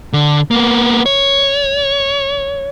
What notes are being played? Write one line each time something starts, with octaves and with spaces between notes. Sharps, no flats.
D3
A#3 B3
C#5